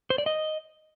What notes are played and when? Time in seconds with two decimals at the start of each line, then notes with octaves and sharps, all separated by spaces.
0.10 C5
0.18 D5
0.26 D#5